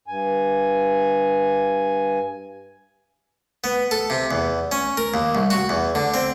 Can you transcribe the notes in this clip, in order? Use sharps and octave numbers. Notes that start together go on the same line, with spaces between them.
G2 G#5
B3
A4
C3
E2
C#4
A#4
D#2
C2
F#4
E2
D3
C4